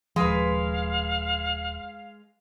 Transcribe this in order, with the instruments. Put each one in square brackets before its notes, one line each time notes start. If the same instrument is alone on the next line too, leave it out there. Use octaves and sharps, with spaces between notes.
[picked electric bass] D#1 F3 [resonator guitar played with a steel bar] G#3 B4 [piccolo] F5